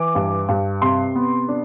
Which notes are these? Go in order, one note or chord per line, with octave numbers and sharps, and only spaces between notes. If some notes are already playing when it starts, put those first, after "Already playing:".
Already playing: E3 D6
G2
G2
C3 C6
B3
D4